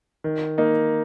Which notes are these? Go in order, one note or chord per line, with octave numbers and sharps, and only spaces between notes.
D#3
A#3 D#4